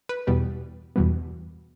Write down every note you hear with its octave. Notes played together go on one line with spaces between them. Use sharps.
B4
E2 B2 G3 B3
E2 B2 G3 B3